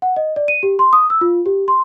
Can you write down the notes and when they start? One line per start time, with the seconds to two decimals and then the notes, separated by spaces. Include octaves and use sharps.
0.02 F#5
0.16 D#5
0.36 D5
0.48 D#7
0.63 G4
0.79 C6
0.93 D#6
1.10 E6
1.21 F4
1.46 G4
1.68 C6